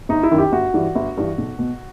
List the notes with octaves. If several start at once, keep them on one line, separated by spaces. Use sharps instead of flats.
G1 D#4
E4
F#2 D#3
G4
G1 F#4
G2 E3
G1
G2 E3
B1
B2